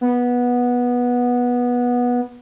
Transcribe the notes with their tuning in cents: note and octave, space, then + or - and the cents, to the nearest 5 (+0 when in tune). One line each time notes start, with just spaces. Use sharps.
B3 -15